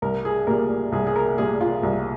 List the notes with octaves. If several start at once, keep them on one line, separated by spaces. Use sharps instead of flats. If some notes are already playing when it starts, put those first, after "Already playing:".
C2 A#4
G#4
A#2 G3 A#4
C2 G#4
G#4
A#4
A#2 G3 G#4
F4
C2